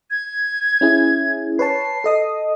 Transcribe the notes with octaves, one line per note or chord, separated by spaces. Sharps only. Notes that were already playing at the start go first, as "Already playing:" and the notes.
G#6
C#4 E4 G#4
B4 C#5 A5 C7
A4 D#5 D#6